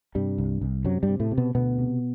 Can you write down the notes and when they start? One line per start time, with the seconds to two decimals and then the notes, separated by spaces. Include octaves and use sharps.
0.15 G2 C3 G3
0.38 C2
0.61 C2
0.85 F#2 C3 F#3
1.03 G2 G3
1.09 C3
1.20 A2 A3
1.31 C3
1.38 B2 B3
1.55 D2 B2 B3
1.78 C3